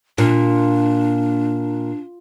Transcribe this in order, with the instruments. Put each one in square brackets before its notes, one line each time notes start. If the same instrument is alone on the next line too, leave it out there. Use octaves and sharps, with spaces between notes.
[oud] A#2 [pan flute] D4